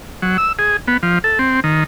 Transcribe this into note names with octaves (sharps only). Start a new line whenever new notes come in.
F#3
E6
G#4
B3
F3
A4
C4
D#3